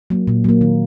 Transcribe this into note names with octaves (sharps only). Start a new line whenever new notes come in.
F#3 A#3
A#2
F#3 A#3
D#3